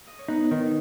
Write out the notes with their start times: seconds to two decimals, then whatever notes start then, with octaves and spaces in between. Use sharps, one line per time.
0.07 D#5
0.19 C#5
0.28 B3 D#4 B4
0.51 D#3